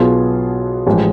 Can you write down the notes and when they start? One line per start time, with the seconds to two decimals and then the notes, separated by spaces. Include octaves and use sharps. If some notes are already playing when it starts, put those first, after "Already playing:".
Already playing: B1 B2 B3 F4 G#4
0.86 A1 A2 F3 G#3